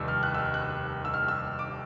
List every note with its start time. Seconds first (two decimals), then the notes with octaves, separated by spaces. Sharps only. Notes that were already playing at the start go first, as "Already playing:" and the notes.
Already playing: F1 D#2 D#3 G3 E6
0.08 F6
0.23 F#6
0.34 E6
0.39 F6
0.54 F#6
1.05 E6
1.14 F6
1.28 E6
1.59 D6